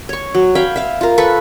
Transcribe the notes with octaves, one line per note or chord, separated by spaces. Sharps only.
C#5 C#6
F#3
F5 G5 G#5 B5
E5 F5
F4 A#4
A4 B4 C#6